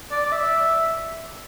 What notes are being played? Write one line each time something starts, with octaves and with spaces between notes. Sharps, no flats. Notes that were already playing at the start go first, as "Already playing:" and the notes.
D5
D5
E5